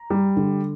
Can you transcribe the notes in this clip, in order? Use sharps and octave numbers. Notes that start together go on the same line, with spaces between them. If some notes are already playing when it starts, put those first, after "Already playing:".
Already playing: A#5
G3
D3